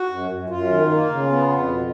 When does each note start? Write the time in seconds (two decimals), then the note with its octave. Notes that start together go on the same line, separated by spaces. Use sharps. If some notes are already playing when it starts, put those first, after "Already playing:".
Already playing: F#4
0.10 F#2
0.30 F#2
0.49 F#2 F4
0.69 D#3
0.89 A#3
1.09 C#3
1.29 B3
1.48 F2
1.68 B2